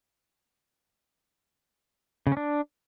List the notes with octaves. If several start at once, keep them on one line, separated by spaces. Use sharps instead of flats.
C#3
C#4
D4